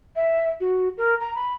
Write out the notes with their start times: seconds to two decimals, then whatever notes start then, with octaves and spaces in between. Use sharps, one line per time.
0.16 E5
0.60 F#4
0.98 A#4
1.20 A#5
1.35 B5